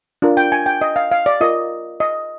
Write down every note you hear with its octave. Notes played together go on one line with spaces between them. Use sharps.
D4 F4 A#4
G5
G#5
G5
D#5
F5
F5
D5
F4 A#4 D#5
D#5